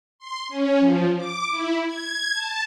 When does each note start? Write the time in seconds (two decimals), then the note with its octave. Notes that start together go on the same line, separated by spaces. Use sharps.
0.19 C6
0.49 C#4
0.80 F3
1.16 D6
1.50 E4
1.86 G#6
2.33 A5